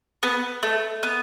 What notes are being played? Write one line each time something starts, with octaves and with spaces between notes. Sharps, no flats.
B3
A3
B3